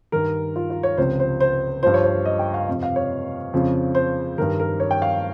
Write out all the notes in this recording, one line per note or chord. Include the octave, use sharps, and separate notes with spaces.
G2 D#3 A#4
F4
F4
C#5
C#2 C3 F3 C5
C5
C5
G2 F3 C5
C#5
C5
D#5
G5
F5
F2 C3 F3
F5
C#5
F2 C#3 F3
C5
G2 D#3 A#4
A#4
C#5
G5
F5